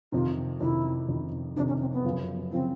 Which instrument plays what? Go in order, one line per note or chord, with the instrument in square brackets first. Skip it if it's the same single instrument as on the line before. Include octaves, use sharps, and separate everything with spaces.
[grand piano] F2 C3 D#3 [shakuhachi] F4
[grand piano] F2 C3 D#3 [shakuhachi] E4
[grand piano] F2 C3 D#3
[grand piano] F2 C3 D#3 [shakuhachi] D4
[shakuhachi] C#4
C4
B3
[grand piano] F#2 C#3 F3
[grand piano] C#3 F3 [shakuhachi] C4